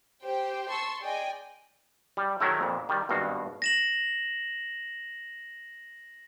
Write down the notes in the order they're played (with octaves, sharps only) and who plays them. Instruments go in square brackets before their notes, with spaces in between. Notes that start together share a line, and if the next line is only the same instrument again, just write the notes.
[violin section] G4 C5 G5
A5 C6 C#6 E6
G#4 D5 D#5 G5 G#5
[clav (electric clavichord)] G3
D#3 F#3 G#3 A3 E4
F2 A#2
D#3 G3
G#1 G2 B2 F#4 F5
[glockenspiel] A#6 E7 F#7